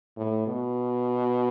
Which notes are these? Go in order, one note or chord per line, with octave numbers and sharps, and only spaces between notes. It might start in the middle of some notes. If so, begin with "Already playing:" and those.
A2
B2